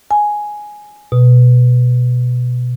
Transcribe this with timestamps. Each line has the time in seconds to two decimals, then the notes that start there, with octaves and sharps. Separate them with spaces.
0.11 G#5
1.12 B2